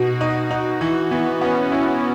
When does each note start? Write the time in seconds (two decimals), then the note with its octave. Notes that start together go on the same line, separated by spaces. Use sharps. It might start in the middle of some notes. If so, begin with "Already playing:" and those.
Already playing: B2 D#4 F#4
0.21 D#4
0.51 D#4
0.81 E3 F#4
1.11 E3 B3
1.41 B3 C#4
1.72 C#4 E4